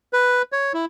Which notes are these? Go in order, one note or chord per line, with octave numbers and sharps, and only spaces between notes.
B4
C#5
E4